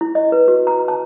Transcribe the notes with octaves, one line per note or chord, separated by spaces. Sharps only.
E4
D#5
B4
F#4
A#5
A5